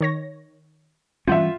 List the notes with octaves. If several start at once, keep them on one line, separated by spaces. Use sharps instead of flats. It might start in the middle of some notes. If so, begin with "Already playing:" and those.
D#3 C#5 A#6
E3 G3 C#4 F4 E5 F#5 G6